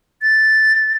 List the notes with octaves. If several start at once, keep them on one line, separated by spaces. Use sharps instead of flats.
A6